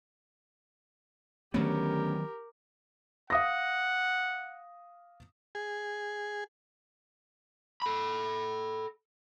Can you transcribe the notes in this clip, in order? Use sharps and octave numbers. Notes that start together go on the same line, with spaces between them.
D2 D#3 F#3 B3 C#4 G4 A#4 D5
F5 F#5 D#6 A#6
G#4
A4 B5